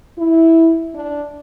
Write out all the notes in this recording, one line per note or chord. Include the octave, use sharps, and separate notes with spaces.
E4
D4